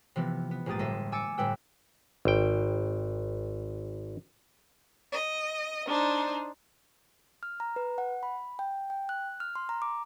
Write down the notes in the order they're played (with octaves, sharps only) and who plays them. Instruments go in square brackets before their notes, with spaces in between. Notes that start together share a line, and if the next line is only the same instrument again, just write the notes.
[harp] C3 E3 F3 B3
B3
A#1 G#2 A#3 G4 D#6 A6
G1 A2 D#5 E5 C6
G#5 D6 E6 G#6 A6 C#7
G1 A2 B4 G5 E6
[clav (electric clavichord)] G#1 G5
[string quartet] D#5
D4 D#4 C5
[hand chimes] F6
A#5
B4
F#5
B5
G5
G5
F#6
F6
C6
A#5
D6